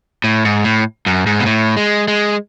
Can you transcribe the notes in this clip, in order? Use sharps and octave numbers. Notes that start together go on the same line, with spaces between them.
A2
G#2
A2
F#2
G#2
B2
A2
G#3
G#3